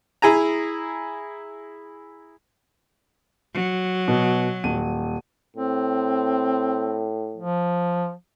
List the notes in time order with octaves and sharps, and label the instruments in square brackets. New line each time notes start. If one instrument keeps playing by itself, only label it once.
[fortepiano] E4 G#4 G#5 A#5
[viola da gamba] F#3
[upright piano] B2
D#1 D#7
[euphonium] A2 [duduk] C4
[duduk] F3